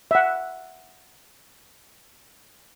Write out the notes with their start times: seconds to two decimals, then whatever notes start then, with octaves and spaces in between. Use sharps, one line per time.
0.11 E5 F#5